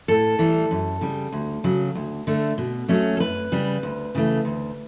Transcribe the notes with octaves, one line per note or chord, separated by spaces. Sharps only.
A2 A4
E3 G3
F#2
C#3 G3
D2
C#3 F#3
D2
D3 A3
B2
F#3 A3 C#4
A4
F#2 B4
C#3 G3
D2
C#3 E3 A3
D2